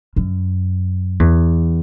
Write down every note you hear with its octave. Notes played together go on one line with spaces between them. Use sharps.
F#2
E2